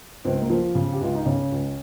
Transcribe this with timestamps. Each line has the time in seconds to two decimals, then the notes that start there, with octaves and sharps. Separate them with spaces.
0.25 C#2 C4
0.42 A#3
0.50 F3
0.75 C#3
0.93 G4
1.01 C#2 F4
1.15 D#4
1.25 C#3 C#4
1.52 C#2